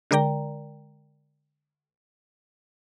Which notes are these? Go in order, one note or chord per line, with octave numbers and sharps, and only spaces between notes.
D3 G#3 A#4 D5 G5 A#5